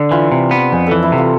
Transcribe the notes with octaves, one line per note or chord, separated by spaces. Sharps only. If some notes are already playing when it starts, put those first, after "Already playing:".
Already playing: D3 D4
E3 F4
C3
B3
F2 G#4
E3 A4
E4
C3
F4